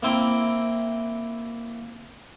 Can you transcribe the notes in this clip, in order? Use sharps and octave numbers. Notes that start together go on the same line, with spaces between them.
A#3 C4 E4 G5